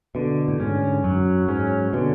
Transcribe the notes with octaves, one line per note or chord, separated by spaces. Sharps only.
B2 D3
A2
G#2 C#4
F#2 F#3
G#2 C#4
B2 D3